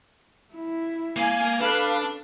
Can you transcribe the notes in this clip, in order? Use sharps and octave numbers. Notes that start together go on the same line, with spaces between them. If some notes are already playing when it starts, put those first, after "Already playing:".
E4
A#3 F5 G#5
D4 A4 B4 F5